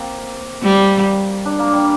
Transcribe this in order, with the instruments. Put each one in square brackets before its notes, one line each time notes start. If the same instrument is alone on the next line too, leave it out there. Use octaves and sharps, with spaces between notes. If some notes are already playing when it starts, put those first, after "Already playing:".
Already playing: [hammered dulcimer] A#3 C4
[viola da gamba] G3
[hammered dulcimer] D4
A#3
G3